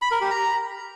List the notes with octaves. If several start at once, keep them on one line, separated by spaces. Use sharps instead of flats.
B5
A#4
G4
A#5